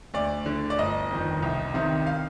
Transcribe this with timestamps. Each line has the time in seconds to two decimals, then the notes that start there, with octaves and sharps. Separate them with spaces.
0.14 D2 D5
0.46 D3
0.70 D5
0.78 G1 D#5
1.11 F2 D#3
1.43 C2
1.74 C3 D#3
2.06 F5